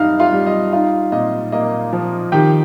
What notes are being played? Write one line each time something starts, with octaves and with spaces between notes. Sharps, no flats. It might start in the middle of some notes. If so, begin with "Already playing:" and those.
Already playing: G2 D#4 F5 F6
F4 F5
G3
D#5
D#4 F4 F5
A#2 D#5
A#3 D#5
F3
D#3 G4 G5